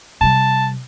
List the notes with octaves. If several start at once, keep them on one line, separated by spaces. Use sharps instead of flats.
C3 G3 A5